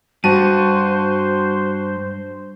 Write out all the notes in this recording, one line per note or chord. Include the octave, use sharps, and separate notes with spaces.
G2 F#4 C5 A5 D#7